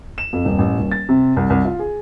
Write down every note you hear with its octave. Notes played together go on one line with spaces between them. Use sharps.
E7
F2
D#1
A1
D#1
A6
C3
C2
C2
F4
G#4